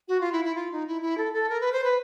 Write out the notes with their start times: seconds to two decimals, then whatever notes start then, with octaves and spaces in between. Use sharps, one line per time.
0.08 F#4
0.21 F4
0.32 E4
0.45 E4
0.55 F4
0.72 D#4
0.87 E4
1.02 E4
1.18 A4
1.34 A4
1.50 A#4
1.61 B4
1.72 C5
1.84 B4